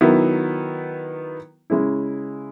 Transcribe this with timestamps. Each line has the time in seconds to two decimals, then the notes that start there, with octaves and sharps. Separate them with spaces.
0.01 D#3 F#3 B3 E4
1.70 C#3 G#3 C#4 E4